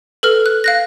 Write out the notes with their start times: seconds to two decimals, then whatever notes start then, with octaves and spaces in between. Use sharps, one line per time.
0.23 A4 B4 F6
0.46 F#6
0.64 F5 F#6 A#6